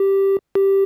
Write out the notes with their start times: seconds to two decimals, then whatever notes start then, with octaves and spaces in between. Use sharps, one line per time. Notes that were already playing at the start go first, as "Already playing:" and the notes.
Already playing: G4
0.55 G4